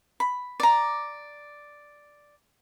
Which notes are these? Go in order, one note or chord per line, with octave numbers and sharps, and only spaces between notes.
B5
D5 A#5